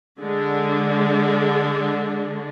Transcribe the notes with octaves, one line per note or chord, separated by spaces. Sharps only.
D3 G#3 D4